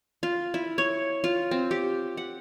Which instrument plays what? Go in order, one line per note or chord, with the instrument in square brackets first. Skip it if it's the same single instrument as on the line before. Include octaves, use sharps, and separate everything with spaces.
[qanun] F4
E4
C#5
F4
C4
G4
F#5